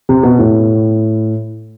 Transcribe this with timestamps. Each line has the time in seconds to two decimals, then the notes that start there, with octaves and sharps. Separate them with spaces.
0.09 C3
0.23 B2
0.39 A2